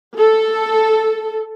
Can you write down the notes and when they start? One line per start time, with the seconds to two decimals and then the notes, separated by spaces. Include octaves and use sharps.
0.19 A4